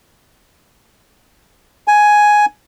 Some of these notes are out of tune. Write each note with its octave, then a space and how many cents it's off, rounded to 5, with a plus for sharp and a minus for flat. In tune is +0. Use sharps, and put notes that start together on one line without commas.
G#5 +5